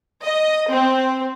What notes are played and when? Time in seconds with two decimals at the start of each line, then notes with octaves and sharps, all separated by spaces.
0.22 D#5
0.71 C4